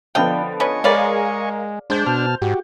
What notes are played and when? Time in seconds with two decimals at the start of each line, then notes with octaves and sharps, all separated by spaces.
0.15 D3 F3 B3 D4 D#5 F5 G5
0.60 C#4 B4 D#5 G#5 C#6
0.84 G#3 G#4 A#4 B4 C#5 D5 F5
1.90 G#3 D4 C5 G6
2.07 B2 A5 F6
2.42 G#2 F#4 G4